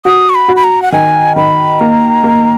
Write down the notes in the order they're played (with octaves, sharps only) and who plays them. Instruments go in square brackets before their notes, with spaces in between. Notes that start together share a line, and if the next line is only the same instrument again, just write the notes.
[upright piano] F#4 [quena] D#6
[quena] C#6
B5
[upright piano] F#4
[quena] B5
A#5
F#5
[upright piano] D#3 [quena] G#5
[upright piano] D#3 [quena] B5
[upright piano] A#3 [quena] A#5
[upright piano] A#3